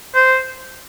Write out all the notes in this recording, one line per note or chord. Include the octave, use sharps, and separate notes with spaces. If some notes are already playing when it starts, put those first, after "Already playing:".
C5